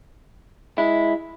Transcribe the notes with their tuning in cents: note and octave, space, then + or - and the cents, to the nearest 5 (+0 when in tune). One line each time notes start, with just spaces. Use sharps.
G#3 +0 E4 +0